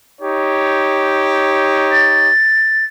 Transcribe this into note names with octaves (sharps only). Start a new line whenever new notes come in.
D#4 G4 C#5
A6